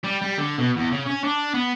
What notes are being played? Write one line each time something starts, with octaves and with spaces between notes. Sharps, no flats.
G3
G3
D3
B2
E2
C#3
C#4
D4
B3